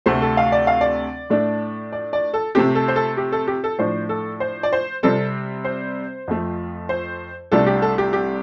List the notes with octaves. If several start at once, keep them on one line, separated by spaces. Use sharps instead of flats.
D2 C3 A3 C5
A4
F5
D5
F5
D5
A2 A3 D4
D5
D5
A4
C3 A3 C4 G4
A4
C5
A4
G4
A4
G4
A4
A2 F3 D4 C5
A4
C5
D5
C5
C3 G3 C4 A4
C5
F2 F3 A3
C5
C2 C3 A3 D4 A4
G4
A4
G4
G4